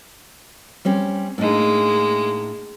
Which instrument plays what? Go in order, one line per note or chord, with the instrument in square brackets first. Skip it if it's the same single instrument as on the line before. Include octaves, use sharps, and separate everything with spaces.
[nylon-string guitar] G3 C4 C#4
[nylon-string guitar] A2 D4 D#4 [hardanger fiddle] G#3 A#3